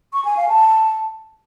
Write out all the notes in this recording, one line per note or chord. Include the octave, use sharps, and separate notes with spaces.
C#6
G#5
F5
A5